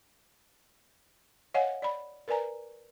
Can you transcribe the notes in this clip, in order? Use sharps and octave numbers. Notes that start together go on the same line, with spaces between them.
C#5 D#5 F5 F#5 G#5
D5 B5
A#4 B4 D5 G#5 A#5